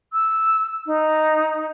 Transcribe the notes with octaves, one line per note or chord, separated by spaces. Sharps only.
E6
D#4